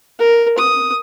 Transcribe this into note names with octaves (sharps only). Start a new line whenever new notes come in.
A#4
D#6